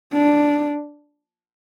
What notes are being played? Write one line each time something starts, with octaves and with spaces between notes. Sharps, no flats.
D4